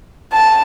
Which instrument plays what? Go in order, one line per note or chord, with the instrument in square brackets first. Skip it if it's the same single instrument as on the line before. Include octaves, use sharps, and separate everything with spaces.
[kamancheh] A5